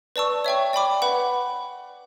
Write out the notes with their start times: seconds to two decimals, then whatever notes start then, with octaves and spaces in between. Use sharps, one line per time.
0.16 B4 D5 A5 C#6 E6
0.45 C#5 E5 G5 C#6
0.73 D5 G5 B5 D6
1.02 B4 F#5 B5